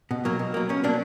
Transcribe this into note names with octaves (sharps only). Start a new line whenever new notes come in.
B2
F#3 A#3
B2
F#3 A#3
B2 C#4
F#3 A#3 D4